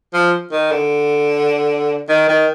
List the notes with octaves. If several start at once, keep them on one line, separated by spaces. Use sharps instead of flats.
F3
D#3
D3
D#3
D#3